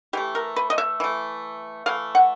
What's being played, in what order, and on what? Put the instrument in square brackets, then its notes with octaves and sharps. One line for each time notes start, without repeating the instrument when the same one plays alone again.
[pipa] E3 A3 G4
A#4
B4
D#5
E5
E3 A3
E3 A3 F5
F#5